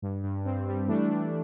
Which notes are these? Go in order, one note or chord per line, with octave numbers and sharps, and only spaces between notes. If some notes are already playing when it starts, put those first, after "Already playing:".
G2
G2
G2 C4
G3
E3 A3 D4
G3